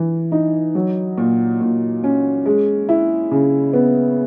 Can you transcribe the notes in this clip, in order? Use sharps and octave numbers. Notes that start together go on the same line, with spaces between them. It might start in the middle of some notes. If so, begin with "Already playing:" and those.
Already playing: E3
D#4
F#3
A#2
A#2
C#4
G#3
E4
C#3
B3